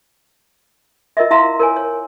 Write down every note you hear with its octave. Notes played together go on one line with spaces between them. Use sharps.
F4 A#4 D#5 E5
E4 E5 F5 A#5 C6
A#4 C#5 G#5
C#5